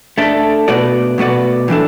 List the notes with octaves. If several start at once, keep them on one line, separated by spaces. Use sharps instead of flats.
A3 D4 A4
B2 A3 F#4 B4 D5
B2 A3 F#4 B4 D5
A2 E3 D4 A4